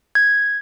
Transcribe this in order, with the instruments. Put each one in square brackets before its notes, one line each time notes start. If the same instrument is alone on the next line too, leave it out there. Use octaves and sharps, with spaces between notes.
[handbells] G#6